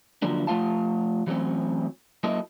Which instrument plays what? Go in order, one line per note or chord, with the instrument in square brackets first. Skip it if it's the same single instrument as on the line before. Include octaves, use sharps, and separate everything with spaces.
[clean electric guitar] D3 F3 F#3 A#3 D4
F3 A3 D4 F4 F5 A5
E3 F#3 G3 A3 C4 C#4
F#3 A#3 E4 A4 D#5